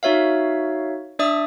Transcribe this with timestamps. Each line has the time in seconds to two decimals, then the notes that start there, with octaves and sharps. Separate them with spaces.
0.03 D#4 F#4 C#5 E5 F5
1.19 D4 D5 E5 D#6